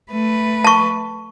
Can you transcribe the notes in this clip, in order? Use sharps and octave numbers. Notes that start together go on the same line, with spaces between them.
A3 B4
A5 C#6